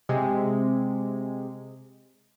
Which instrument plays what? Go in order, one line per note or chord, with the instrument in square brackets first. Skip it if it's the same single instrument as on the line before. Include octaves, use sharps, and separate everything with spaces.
[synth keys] C3 G#3